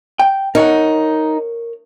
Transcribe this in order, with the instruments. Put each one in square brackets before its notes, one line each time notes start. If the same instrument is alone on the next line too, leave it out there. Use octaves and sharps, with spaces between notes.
[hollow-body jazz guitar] G5
[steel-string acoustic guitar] D#4 [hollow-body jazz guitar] A#4 C#5 F#5